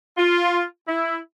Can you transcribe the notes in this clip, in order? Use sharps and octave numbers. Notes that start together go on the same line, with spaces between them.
F4
E4